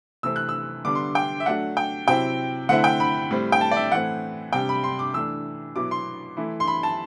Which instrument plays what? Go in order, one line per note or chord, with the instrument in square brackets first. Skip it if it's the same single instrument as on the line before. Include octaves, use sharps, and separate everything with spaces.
[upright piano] C3 E3 A3 C4 E6
F#6
E6
D3 G3 B3 D4 D6
C6
G5
E5
F#3 A3 D4 F#5
G5
C3 F#3 C4 E4 G5
D3 A3 C4 E4 F#5
G5
B5
A2 G3 C4
G5
A5
D5
E5
A2 E3 A3 C4 F#5
C3 G3 D4 G5
B5
C6
D6
E3 A3 D4 E6
B2 F#3 B3 E4 D6
C6
E3 A3 E4
C6
B5
A5